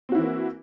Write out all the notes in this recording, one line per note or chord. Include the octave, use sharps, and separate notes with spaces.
E3 A#3 C4 E4 F#4